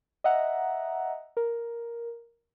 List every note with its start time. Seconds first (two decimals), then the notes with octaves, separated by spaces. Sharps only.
0.24 D#5 E5 F#5 A#5
1.37 A#4